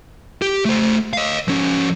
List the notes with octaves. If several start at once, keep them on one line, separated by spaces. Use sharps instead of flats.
G4
A3 C5
D#5 F5
F3 C#4